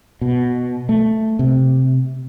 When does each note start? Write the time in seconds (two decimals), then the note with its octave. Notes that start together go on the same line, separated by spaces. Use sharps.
0.21 B2
0.89 A3
1.39 C3